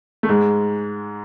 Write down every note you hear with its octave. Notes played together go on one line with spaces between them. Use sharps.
A3
G#2 G#3